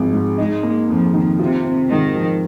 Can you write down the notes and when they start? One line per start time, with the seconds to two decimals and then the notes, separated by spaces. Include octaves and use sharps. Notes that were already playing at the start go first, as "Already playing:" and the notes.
Already playing: G#1 F3 G#3
0.13 G#2
0.38 G#3 D#4
0.63 A#3
0.89 F2 F3
1.14 D#3
1.39 C3 F4
1.64 C4
1.90 G#2 D#3
2.15 F3